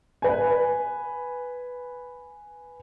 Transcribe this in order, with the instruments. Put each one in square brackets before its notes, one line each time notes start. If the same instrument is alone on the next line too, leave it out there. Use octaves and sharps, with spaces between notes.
[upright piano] B4 G#5